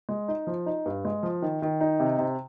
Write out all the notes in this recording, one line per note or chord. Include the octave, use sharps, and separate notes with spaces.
G#3
D#4
F3
D#4
G2
G#3
F3
D#3
D#3
D#4
C3
C3